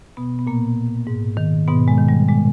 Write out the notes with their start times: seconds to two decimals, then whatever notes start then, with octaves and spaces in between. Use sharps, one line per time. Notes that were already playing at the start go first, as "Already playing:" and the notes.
0.17 B2 B3
0.39 B3
0.47 A#2 A#3
1.07 G#2
1.37 D#3
1.68 G#2 B2 B3
1.88 G#3
1.98 D#3
2.09 G3
2.28 A#2 G#3